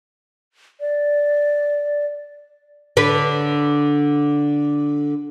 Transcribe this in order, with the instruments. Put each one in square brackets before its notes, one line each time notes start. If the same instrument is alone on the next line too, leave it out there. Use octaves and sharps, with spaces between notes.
[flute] D5
[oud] D3 B4